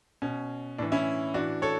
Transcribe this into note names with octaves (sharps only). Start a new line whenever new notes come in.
B2 C#4
A2 E3 D4
C#4 E4
A2 E3 D4 F#4
A4 C#5